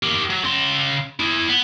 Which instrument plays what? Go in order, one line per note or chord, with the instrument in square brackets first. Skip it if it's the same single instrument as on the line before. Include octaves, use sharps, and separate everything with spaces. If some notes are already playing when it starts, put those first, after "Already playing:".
[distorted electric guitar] G4 A#4
F#3
C#3 C6
E4 G#4
B3